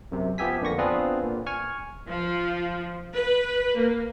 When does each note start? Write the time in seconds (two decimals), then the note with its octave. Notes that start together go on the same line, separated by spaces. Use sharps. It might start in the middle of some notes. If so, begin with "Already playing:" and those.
0.12 F#2 C3
0.38 F3 B3 G4 E5 G#5 B6
0.61 F2 D3 A#3 C#6 A#6
0.78 B3 C4 D4 F4 G#4 B4
1.24 A#2
1.47 G#5 C#6 F6
2.07 F3
3.14 B4
3.78 A#3